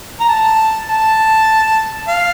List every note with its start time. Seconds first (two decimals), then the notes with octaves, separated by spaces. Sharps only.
0.20 A#5
0.29 A5
0.89 A5
2.07 F5